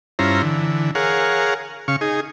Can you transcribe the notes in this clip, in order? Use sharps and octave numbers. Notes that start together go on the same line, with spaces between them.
G2 C#4 E4 F4 C5 A#5
D3 E3
G#4 A#4 C#5 F5 F#5
C#3 F5 C#6
D#4 G#4